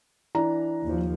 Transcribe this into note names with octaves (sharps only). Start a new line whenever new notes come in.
E3 D4 A#5
D#2 F3